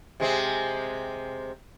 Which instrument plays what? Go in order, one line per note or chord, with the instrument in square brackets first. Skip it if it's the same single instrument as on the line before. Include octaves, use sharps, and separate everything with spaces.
[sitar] C3 G#3 C4